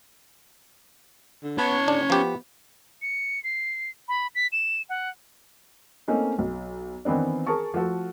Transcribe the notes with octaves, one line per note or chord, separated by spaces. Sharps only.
D3
B3 C#4 C#5 A5
C#3 D4
F3 B3 G4
C#7
C7
B5
B6
E7
F#5
A3 A#3 C4 C#4 D#4
B1
D#3 E3 B3 C4 D4
G#4 A#4 A5 C#6
F3 A3 F#4 A4